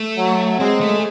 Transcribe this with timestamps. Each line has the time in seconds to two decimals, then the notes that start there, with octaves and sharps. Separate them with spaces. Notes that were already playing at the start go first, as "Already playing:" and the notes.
Already playing: A3
0.18 F#3
0.60 G#3 C4
0.81 A3